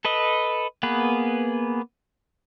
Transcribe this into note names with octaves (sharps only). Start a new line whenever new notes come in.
A4 B4 D#5
A#3 B3 G#4 B4